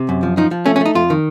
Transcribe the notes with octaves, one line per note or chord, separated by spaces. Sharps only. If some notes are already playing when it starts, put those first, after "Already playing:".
Already playing: C3
F#2
F3
F3 D#4
F3
A3 C#4
C#4
A3 D#4
F2 F4
D#3